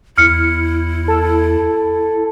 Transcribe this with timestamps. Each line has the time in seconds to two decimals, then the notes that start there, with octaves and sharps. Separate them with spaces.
0.18 E2 E4 F6 C#7
1.08 A4